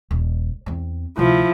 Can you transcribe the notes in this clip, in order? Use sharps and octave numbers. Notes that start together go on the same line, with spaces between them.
D#1
E2 C4
D2 C3 F3 E4